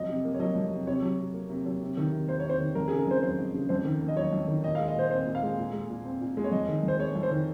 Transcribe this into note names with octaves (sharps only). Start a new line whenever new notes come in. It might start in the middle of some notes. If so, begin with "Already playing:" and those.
Already playing: F2 F#3 D#5
C3
A#3
C#5
F#3 D#5
F2
C3
C3 C#5
F#3
C3
A#3
C3
F#3
C3
D#3
C3
A#3 C5
C3 C#5
C5
D#3
F2 A#4
C#3 G#4
A#4
F2 C5
F#3 C5
F2
C#3
F2 C5
D#3
A#3
D#5
F#3 C#5
F2
D#3
A#2 D#5
G#3 F5
D#5
A#2 C5
C4 C5
A#2
F5
G#3
A#2
G#3
A#2
C4
A#2
G#3
C#5
F2 D#5
D#3
F2 C5
G#3 C#5
F2
C5
D#3